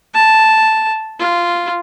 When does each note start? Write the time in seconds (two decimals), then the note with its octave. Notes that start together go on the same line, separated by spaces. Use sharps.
0.14 A5
1.19 F4